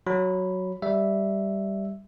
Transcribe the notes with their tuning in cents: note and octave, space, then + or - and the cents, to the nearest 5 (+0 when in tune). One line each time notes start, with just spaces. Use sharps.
F#3 +0 B5 +0
G3 +0 E5 +0